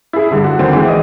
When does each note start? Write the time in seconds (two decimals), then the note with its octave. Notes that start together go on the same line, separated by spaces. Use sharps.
0.13 E4 G#4
0.31 G2 D3
0.44 F#4
0.59 D2 D3 D#3 C4
0.73 E3 G#3
0.88 D#5 D#6